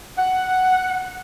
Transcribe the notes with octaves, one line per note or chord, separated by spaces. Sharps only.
F#5